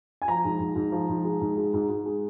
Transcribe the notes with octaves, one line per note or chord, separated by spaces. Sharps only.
G#5
F3 A#5
G#2
G#2
G#2
F3
G#2
G#3
G#2
G#3
G#2
G#2
G#3